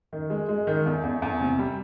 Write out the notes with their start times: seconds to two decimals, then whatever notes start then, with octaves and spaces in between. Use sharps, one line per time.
0.13 D#3
0.30 G#3
0.49 G#3
0.67 D#3
0.86 E2
1.04 E2
1.22 E2
1.40 C3
1.59 G3